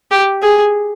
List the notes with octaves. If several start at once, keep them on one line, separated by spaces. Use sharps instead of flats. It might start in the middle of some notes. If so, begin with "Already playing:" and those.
G4
G#4